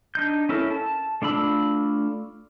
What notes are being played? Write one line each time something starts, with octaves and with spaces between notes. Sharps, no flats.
D4 D#4 G6
C#4 E4 A4 A#4
A5
A3 D4 F4 B5 E6